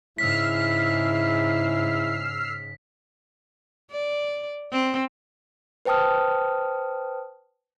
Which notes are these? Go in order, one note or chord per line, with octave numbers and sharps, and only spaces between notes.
G#2 C#3 E4 E6 F6 B6 C7
D5
C4
B4 C5 G5 A5 D#6 F6